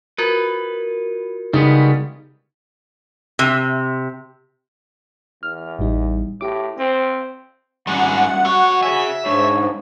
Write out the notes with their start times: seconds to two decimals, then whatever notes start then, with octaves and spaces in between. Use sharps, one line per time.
0.18 F4 F#4 A#4 B4
1.53 C#3 G3 G#3 B3 D#4
3.39 C3
5.43 E2 F6
5.79 A1 G3 D#4
6.41 A2 G4 D6
6.78 C4 C5
7.87 G#2 D#3 G3 C#4 F#5
8.45 A3 F#4 C#5
8.83 G#4 C#5 E5 G#5
9.26 G#2 G#3 D4 C#5